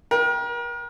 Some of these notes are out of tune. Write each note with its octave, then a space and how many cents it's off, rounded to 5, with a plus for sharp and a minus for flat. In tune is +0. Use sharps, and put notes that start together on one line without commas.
A#4 +40 G5 +0